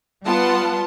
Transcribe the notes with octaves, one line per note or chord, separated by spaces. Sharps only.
G3 B3 F4 F#5 A5 C6